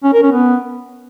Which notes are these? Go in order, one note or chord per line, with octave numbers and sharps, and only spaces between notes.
C#4
A#4
C#4
B3